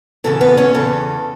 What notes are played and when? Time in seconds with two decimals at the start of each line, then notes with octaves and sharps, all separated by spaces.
0.24 E2 C#3 E3 A4
0.41 B3 B4
0.57 C#4 C#5
0.74 E2 C#3 E3 A4